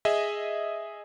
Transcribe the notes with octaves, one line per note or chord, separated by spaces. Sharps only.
G#4 D#5 E5